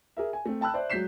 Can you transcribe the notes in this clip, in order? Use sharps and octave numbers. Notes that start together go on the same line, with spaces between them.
G#4 A#4 E5
G#5
A3 C4
G5 A5 B5 E6 F#6
C5 D5 E5
F#3 G#3 G6 B6 C7 E7